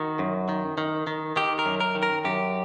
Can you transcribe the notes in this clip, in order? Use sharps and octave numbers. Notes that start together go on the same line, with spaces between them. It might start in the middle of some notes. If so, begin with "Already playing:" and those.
Already playing: D#3 F#4
F#2
D#3
D#3
D#3
D#3 G4
A#4
F#2
A#4
D#3
A#4
F#2 G4